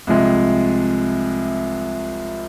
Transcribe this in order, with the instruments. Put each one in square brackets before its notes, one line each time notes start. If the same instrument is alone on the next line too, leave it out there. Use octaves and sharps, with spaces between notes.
[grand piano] C2 C3 F3 G#3